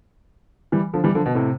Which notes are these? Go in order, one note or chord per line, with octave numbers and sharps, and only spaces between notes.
E3 G3
D3 F3
E3 G3
D3 F3
B2
A2 C3